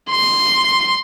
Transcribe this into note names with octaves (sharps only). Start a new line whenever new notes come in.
C6